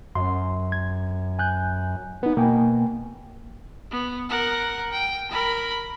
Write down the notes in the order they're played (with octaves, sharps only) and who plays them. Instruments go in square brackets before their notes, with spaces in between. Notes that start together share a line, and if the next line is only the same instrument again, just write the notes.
[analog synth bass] F#2 [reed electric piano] C6
[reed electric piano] G#6
G#5 F#6 G6
[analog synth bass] B3 [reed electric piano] D#4 B4
[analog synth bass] B2 [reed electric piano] A#3 G5 G#5
[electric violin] B3
A#4 F#5
G5
A#4 B5